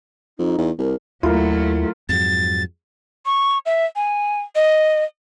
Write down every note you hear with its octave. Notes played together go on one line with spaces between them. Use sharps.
F2 D#4
E2
C2 A#4
D#2 F#3 A3 E4 F4 A#4
F2 G#2 F#3 A6
C#6
E5
G#5
D#5